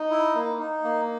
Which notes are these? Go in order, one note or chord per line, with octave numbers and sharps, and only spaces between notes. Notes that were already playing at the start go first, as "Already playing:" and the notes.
Already playing: D#4
E4
A#3
D#4
A#3